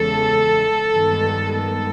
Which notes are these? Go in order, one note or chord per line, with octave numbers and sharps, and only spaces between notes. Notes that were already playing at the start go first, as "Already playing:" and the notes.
Already playing: E2 C#3 E3 G#3 A4
G2 D#3 G#3 B3
A4